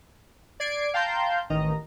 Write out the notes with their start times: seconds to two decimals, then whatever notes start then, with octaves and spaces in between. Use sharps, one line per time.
0.60 D5 G#6 C7 D7
0.94 F5 G5 A5 A#5 C6 G6
1.50 A1 D#3 D#5 A#5